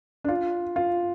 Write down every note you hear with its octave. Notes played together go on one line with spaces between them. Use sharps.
D4
F4
F4